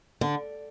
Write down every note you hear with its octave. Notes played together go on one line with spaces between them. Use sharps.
D3